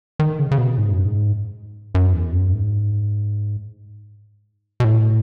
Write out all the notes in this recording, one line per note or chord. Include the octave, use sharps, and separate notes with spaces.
D#3
C#3
C#3
B2
G#2
F#2
G#2
F#2
E2
F#2
G#2
B2
A2